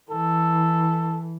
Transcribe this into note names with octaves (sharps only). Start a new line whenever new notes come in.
E3 A4